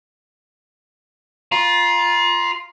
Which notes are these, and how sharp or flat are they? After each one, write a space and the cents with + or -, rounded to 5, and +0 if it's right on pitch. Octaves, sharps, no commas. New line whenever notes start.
F4 +0 A#5 +40